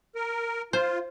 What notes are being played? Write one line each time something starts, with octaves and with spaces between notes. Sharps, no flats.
A#4
F4 C5